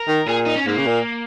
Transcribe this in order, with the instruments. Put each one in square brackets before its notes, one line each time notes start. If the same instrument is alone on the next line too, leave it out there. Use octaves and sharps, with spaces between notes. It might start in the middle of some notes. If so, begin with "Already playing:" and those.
Already playing: [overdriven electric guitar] A#4
[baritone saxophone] D#3
[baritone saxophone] A#2 [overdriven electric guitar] G#4
[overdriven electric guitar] D#4
C#4
[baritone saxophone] G#2 [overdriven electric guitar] A#3
[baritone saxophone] C#3
A#2